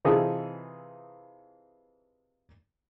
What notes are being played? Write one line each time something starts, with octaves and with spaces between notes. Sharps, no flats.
C3 E3 D#4 F4 G#4 A4